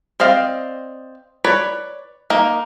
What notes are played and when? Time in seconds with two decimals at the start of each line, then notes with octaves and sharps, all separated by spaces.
0.20 C4 D5 D#5 F5
1.44 B4 C#5 D5
2.30 A#3 D#4